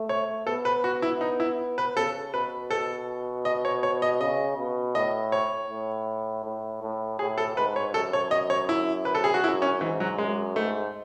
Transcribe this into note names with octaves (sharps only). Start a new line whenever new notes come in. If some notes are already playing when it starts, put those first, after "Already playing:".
Already playing: A3
C#5
B3 A4
B4
F#4
E4
D#4
E4
B4
C#3 A4
B2 B4
A4
D#5
C#5
C#5
D#5
C#3 D#5
B2
A2 D#5
C#5
A2
A2
A2
A2 G#4
A4
G#2 B4
C#5
F#2 A4
C#5
D#5
C#5
E4
B4
A4
G#4
F#4
F#2 E4
C#4
G#2 E3
F#3
F#2 G#3
G#2 A3